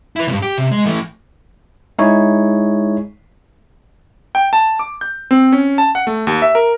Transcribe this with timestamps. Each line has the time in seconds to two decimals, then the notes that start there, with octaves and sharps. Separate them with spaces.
0.16 E4 B4
0.27 C#2 G2
0.42 G4
0.58 C3
0.72 G#3
0.85 E3 A3
1.99 G#3 D#4 E4 G#4 C#5
4.35 G5
4.53 A5
4.79 D6
5.01 G6
5.31 C4
5.52 C#4
5.78 A5
5.95 F#5
6.07 A3
6.27 D#2
6.42 E5
6.55 A#4